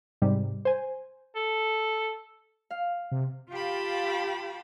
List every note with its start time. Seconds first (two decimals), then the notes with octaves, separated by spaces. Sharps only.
0.22 G#2 C3 G3
0.65 C5 G#5
1.35 A4
2.70 F5
3.12 C3
3.51 F4 G4 F5 G5 A5 B5